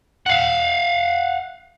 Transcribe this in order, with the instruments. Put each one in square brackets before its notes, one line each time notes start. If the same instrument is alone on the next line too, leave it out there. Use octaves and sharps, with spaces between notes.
[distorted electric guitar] F5 F#5